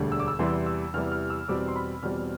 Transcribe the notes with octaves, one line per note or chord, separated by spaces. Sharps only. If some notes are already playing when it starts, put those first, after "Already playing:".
Already playing: E1 D2 D3 G3
E6
D6
E6
E2 C3 E3 G3 C6
E6
E2 C3 E3 G3 F6
F6
E6
E2 B2 G3 C4 D6
C6
B5
E2 B2 G3 C4 F6